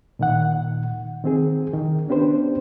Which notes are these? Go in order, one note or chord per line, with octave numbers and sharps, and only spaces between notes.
A#2 D#3 F#5
D#3 C4 G#4
D#3
B3 C#4 D4 G4 B4 C5